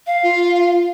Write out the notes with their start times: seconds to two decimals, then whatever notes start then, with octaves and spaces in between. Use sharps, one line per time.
0.07 F5
0.23 F4